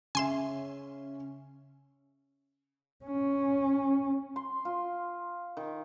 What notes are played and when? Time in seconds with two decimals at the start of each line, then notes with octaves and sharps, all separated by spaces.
0.15 C#3 C#4 E5 G#5 C6 E7
3.05 C#4
4.36 C6
4.65 F4
5.57 D#3